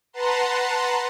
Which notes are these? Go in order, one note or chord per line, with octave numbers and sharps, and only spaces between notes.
B4 F#5 A5 A#5 C6